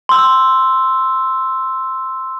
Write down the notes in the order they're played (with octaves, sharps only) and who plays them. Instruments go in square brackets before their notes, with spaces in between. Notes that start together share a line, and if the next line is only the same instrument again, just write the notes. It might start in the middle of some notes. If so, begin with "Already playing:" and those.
[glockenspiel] C6 E6